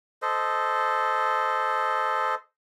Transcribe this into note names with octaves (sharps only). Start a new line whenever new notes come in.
A4 C5 D#5